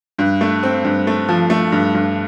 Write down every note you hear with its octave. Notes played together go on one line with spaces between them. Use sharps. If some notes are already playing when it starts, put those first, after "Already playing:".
G2
A3
C4
G2
A3
F3
A3
G2
G2